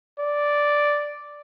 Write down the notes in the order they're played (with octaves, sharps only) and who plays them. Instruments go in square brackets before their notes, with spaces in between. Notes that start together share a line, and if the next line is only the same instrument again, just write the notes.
[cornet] D5